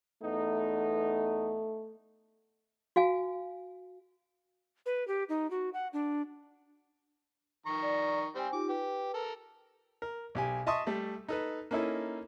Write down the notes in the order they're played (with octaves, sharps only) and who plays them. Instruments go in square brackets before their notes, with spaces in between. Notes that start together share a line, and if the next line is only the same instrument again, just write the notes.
[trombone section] E2 B3 D#4 [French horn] A3
[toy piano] F#4 F5 G#5
[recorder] B4
G4
D#4
F#4
F#5
D4
[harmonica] D#3 A#5 C#6
[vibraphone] D5
[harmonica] G3 C4 [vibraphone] C5 G5 G#5
[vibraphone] D#4 F4 G4 [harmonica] D6
[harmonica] G4 [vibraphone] B4
[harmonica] A4 A#4
[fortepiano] A#4
B1 G4 G#5
D#5 E5 A5 C6 C#6 D#6
G3 A3
D#4 A4 B4
A#3 C#4 D#4 E4 A4